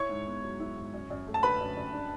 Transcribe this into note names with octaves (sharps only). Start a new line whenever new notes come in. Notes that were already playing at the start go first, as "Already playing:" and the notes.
Already playing: E4 C#5 C#6
G#2
B3
F#3
E4
G#2
F#2
F#2
A3
A5
D3 B4 B5
F#2
F#2
D4